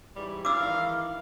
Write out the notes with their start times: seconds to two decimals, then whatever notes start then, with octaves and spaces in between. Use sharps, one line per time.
0.16 G#2 E3 G3
0.45 E3 D5 F5 D6 E6
0.60 D#3 E3